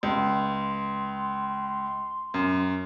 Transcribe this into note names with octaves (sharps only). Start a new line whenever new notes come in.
C#2 C6
F#2